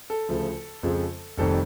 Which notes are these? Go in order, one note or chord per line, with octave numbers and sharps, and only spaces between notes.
A4
D2 C#3 F3 A3
F2 C#3 F3 G#3 C4
F1 F2 C3 D#3 G3 A4